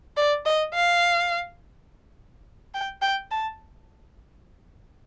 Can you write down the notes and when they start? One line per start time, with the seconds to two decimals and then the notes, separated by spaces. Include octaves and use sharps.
0.17 D5
0.46 D#5
0.74 F5
2.74 G5
3.02 G5
3.31 A5